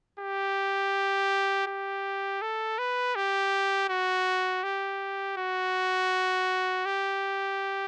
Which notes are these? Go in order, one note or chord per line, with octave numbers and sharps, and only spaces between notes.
G4
G4
A4
B4
G4
F#4
G4
F#4
G4